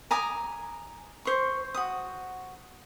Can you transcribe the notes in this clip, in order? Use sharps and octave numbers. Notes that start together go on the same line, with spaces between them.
G#5 A#5 D6 D#6
C5 C#6
F#4 D#6